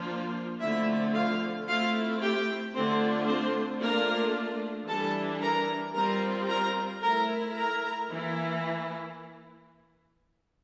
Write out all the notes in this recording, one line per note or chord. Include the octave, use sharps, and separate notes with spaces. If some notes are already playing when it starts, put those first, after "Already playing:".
Already playing: F3 A#3 D4 F4
D3 F3 A3 C4 E4 E5
F4 F5
A3 C4 E4 F4 F5
G4 G5
D3 A3 C4 D4 F4 C5
C4 C5
A3 A#3 D4 F4 A#4
E3 G3 D4 A4 A5
A#4 A#5
G3 C4 F4 A#4 A#5
A#4 A#5
A3 E4 A#4 A#5
A#4 A#5
E3 A#3 E4